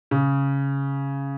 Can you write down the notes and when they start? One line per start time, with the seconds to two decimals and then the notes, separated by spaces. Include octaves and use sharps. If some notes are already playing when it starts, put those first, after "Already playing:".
0.11 C#3